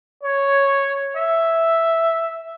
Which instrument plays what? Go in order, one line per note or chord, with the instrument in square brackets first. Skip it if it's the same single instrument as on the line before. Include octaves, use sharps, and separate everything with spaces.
[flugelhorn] C#5
E5